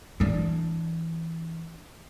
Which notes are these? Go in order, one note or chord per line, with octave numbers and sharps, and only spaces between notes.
E3 D4